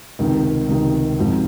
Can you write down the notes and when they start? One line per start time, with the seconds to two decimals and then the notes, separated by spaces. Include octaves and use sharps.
0.19 C#2 C3 D#3
0.69 C#2 C3 D#3
1.18 G#2 F3 C4